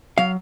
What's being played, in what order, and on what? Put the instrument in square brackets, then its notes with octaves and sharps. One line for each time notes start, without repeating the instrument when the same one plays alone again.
[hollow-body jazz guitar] F#3 F5